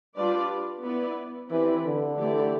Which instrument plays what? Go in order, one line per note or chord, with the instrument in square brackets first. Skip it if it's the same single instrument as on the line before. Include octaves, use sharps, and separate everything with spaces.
[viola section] G3 D4 F4 B4 D5
B3 E4 B4 D5
[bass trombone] E3 [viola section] C4 E4 G4 B4 D5
[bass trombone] D3
[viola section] E3 A3 E4 G4 D5